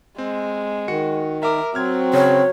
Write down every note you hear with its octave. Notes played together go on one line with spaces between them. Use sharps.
G#3 C4
D#3 F#4 C#7
A#4 E5 D6
F#3 C4 F6 G#6
C#3 C#5 G5